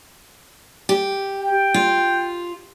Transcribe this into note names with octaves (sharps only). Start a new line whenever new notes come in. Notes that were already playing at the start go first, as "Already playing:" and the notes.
G4
G5
F4